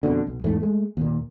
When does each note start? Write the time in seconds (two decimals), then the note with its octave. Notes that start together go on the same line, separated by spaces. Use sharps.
0.03 F2 B2 D3
0.27 B1
0.44 E2 G#2 A3
0.60 G#3 A3
0.97 D#2 A#2